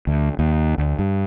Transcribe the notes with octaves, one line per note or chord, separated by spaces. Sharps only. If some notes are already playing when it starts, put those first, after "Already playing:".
D2
D#2
D2
G2